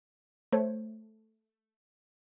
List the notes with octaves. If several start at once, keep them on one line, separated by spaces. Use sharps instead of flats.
A3 C5 C#5